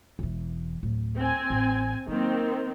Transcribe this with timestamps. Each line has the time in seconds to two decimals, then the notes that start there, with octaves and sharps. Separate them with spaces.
0.19 E1 E3
0.83 D1
1.17 C4 G#5
1.50 A1
2.08 D#3 F#3 A#3 C4